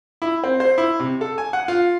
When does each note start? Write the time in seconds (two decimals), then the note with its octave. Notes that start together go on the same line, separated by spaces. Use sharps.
0.22 E4
0.44 C4
0.60 C5
0.78 E4
1.00 C3
1.21 A4
1.38 G#5
1.53 F#5
1.68 F4